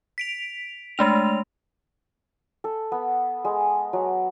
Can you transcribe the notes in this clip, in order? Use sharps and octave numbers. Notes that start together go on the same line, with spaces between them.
B6 D7 F7
G#3 A3 D4 F7
A4
B3
G#3
F#3